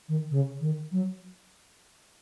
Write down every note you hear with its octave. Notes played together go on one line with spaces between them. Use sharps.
D#3
C#3
D#3
F#3